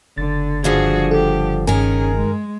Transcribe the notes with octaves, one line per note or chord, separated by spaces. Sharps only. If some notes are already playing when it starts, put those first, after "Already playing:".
F#1 D3 A6
G2 D3 F3 F#4 G#4
G4 A4
G2 D#3 C#4 G#4 A#4 G#5
G#3